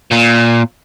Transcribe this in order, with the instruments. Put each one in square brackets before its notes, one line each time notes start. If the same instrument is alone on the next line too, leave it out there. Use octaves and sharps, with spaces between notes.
[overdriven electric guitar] A#2